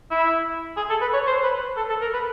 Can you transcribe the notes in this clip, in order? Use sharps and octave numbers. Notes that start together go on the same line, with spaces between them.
E4
G#4
A4
B4
C#5
C5
B4
A4
A4
A#4
B4